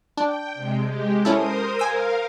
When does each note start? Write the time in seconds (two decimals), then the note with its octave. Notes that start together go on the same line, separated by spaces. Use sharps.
0.17 D4 G5
0.54 C3 G#3
0.85 G#3 G4
1.25 C#4 E4 A4 A#4 C5 D#6
1.79 A#4 F5 G#5 E6